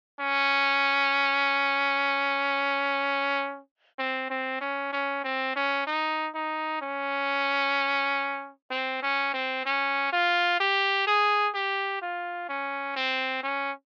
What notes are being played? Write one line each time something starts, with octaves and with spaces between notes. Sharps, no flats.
C#4
C4
C4
C#4
C#4
C4
C#4
D#4
D#4
C#4
C4
C#4
C4
C#4
F4
G4
G#4
G4
F4
C#4
C4
C#4